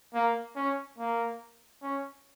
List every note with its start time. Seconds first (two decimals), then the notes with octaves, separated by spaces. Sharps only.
0.14 A#3
0.56 C#4
0.98 A#3
1.82 C#4